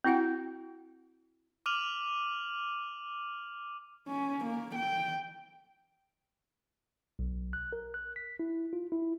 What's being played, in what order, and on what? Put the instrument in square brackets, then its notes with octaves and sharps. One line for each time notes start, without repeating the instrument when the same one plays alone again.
[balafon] C4 E4 F#4 F#5 G5
[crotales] D6 F6 D#7 F7 F#7
[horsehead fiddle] C#4
A#3
G5
[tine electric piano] B1
F#6
A#4
F#6
B6
E4
F4
E4